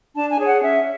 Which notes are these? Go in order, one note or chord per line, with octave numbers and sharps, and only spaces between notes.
D4 A5
G#5
G#4 C#5
F#5
C#4 E5